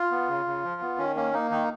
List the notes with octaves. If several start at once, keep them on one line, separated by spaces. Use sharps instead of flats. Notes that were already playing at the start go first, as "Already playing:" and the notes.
Already playing: F4
B3
C#3
C#3
F3
B3
D#3 C#4
A#3 C#4
A#3 D#4
D#3 D#4